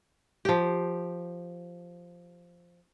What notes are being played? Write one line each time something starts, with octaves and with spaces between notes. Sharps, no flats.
F3 G4